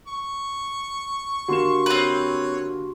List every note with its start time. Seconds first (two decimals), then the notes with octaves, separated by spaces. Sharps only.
0.07 C#6
1.48 D3 A#3 F#4 G4 C6 E7
1.86 C4 B4 C#5